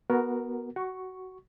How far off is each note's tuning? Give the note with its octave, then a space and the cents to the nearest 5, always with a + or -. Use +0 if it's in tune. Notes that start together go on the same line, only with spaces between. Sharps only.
B3 -20 F#4 +0 A#4 +0
F#4 +15 C#6 +0